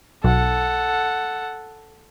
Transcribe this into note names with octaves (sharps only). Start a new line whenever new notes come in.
B1 A4 F#5